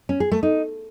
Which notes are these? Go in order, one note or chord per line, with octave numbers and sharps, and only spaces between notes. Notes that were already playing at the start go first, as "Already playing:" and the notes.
C#4
G#4
A3
D#4